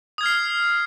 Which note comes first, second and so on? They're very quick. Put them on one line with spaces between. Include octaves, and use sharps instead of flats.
D#6 G#6 F6 C7